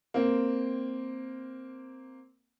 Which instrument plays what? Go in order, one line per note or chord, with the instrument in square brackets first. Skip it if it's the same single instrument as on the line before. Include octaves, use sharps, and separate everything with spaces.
[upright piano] A#3 C4